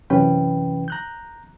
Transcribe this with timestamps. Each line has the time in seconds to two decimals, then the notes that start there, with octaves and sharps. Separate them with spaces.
0.10 F#2 C3 E3 C#4 B4 G5
0.88 A#5 F#6 G6